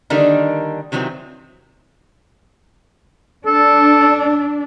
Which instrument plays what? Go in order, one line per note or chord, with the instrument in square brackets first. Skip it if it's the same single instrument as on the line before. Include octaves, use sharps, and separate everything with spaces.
[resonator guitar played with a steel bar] D3 D#3 G3 A#3 D4 D#4
C3 D#3 E3 F#3 C4
[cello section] D4 [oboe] A4